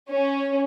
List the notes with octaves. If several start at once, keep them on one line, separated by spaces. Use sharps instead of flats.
C#4